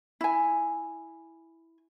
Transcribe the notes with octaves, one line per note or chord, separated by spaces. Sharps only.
E4 G#5